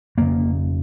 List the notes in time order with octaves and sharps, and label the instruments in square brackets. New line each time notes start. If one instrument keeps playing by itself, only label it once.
[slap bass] F2 C#3 A#3